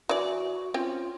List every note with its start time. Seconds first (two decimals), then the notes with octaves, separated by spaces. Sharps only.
0.09 E3 F#4 D5
0.74 C4 C#4 F4 G5